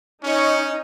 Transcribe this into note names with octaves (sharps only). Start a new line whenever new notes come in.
C#4 D#4 C#5